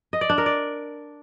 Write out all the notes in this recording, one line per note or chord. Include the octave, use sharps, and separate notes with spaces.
D#5
D5
D4
A#4
D5